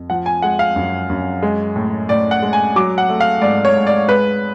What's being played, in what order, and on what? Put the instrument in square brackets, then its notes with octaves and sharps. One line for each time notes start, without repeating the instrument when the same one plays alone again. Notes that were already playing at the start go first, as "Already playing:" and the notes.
Already playing: [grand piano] F2
F3 F#5
G#5
G#3 F#5
F5
F#2
F#2
G#3
A2
A2 D5
F#5
G#3
G#5
F#3 D6
F#5
A3
F5
G#2 D5
C#5
G#2
D5
G#3 B4